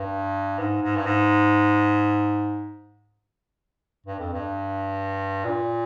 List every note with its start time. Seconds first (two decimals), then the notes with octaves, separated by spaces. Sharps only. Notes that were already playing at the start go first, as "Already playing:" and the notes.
Already playing: G2
0.59 G#2
0.82 G#2
0.96 G2
1.05 G#2
4.06 G2
4.20 F2
4.33 G2
5.45 A#2